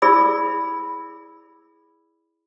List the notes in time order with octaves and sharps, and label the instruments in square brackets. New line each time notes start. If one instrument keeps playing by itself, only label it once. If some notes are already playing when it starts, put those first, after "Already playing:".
[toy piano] E4 G#4 D5 B5 E6